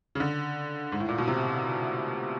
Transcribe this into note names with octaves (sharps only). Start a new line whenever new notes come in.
C#3
D3
G#2
A2
A#2
B2
C3